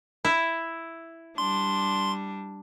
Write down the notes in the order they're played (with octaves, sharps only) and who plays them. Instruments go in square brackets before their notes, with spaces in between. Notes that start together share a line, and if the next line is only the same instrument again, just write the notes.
[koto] E4
[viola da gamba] G3 D4 [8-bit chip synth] C6